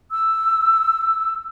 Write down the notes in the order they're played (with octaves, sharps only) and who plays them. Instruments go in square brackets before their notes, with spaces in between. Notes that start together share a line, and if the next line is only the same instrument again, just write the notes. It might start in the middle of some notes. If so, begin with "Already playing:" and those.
[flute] E6